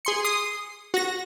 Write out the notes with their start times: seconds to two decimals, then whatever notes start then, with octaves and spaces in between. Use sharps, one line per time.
0.05 G#4 C6 C#7
0.24 D#6 C7 D#7
0.94 F#4 A#6